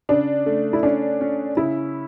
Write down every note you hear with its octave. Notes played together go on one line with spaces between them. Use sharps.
C#3 D4
A3
E4
C#4 D4
C#4
C#3 E4